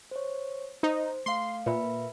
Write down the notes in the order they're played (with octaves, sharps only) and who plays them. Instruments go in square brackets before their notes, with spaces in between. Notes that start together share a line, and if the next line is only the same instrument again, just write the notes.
[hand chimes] C5 C#5
[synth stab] D#4 [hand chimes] C5
[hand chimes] A3 F5 [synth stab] C6
[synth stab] A#2 [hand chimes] B4 E5 B5